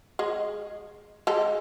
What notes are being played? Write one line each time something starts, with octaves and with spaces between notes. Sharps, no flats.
G#3 G#4 D#5
G#3 G4 A4